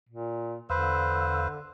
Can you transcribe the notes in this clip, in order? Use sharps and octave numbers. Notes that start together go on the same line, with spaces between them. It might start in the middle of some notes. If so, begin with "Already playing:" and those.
A#2
E2 D3 B4 C5 F5 E6